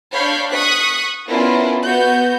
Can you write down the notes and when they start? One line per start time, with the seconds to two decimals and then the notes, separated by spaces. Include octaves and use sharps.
0.13 D4 C#5 F5 B5 G6
0.51 C#6 D#6 F#6 B6
1.29 B3 C#4 D4 E4 F4 A#4
1.81 B3 F#4 G6